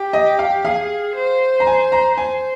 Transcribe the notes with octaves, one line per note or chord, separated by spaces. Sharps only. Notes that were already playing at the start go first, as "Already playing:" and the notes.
Already playing: G4
D#5
F5
G#4 F5
C5
A#5
G#5
A#5
C5 G#5